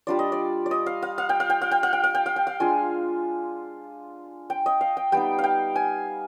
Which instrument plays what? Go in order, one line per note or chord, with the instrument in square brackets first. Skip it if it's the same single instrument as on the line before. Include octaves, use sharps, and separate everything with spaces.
[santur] G3 D4 F4 D5
D#5
D5
D5
D#5
F5
F5
F5
G5
F5
G5
F5
G5
F5
G5
F5
G5
F5
G5
F5
G#3 D4 F4 G#5
G5
D#5
F5
G5
G3 B3 D#4 G5
F5
G5
G#5